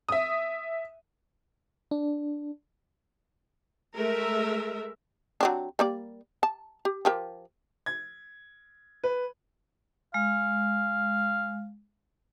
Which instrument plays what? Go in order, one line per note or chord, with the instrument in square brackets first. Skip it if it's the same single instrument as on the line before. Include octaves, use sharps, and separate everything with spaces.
[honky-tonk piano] E5 D#6
[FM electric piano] D4
[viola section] G#3 A3 A#4 E5
[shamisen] F#3 C4 D4
G3 A#3 D5
A5
G4
F3 G4 A#4
[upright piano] G#6
B4
[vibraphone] G#3 [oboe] F5